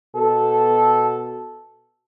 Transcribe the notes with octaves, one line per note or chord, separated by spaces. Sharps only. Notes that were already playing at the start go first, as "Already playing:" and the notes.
B2 A4